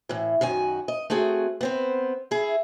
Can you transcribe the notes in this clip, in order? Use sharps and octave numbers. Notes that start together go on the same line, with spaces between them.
A2 E3
F#2 D#3 F#4 G#5
D#5
A3 C4 F#4 G#4
B3 C4 C5
E4 G#4